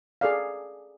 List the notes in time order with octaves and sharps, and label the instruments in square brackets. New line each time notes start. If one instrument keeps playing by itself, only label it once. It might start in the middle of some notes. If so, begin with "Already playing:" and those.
[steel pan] G#4 A4 D5 F5